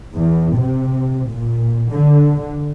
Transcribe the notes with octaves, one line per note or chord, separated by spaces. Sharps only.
E2
C3
A#2
D3